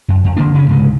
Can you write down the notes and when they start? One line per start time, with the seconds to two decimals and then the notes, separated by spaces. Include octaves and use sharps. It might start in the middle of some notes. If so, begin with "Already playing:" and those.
0.08 F#2
0.24 F2
0.37 D3 A#3 D4
0.54 C#3 C#4
0.69 C#2 G#2 C3 G#3